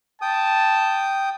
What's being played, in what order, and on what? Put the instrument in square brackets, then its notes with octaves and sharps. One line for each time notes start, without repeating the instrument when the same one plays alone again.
[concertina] G5 D#6 [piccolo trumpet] A5